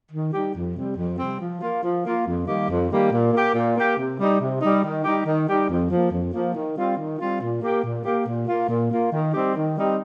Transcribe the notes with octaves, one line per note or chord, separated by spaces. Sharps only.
D#3
G3 D#4 G4
F2
C3 G3 C4
F2
C3 G3 C4
F3
A#3 F4
F3
A#3 F4
F2
D#3 G3 A#3 G4
F2
D#3 G3 A#3 G4
A#2
A#3 G4
A#2
A#3 G4
C3
G3 D#4
C3
G3 D#4
D#3
G3 D#4 G4
D#3
G3 D#4 G4
F2
F3 A#3
F2
F3 A#3
D#3
G3 C4 F4
D#3
G3 C4 F4
A#2
A#3 G4
A#2
A#3 G4
A#2
A#3 F4
A#2
A#3 F4
D#3
G3 C4 D#4 G4
D#3
G3 C4 D#4 G4